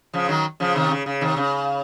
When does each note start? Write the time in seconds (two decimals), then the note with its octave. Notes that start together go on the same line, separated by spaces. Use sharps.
0.13 C#3 F3
0.29 D#3 F#3
0.60 C#3 F3
0.76 C3 D#3
0.90 C#3
1.06 C#3
1.21 C3 D#3
1.36 C#3